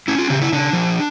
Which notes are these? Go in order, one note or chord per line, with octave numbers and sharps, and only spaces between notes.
C#4 E4
F4
C#3 G4
E4
C#3 D4
F3